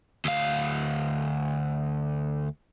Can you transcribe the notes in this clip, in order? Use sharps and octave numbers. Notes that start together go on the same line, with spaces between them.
D2 F5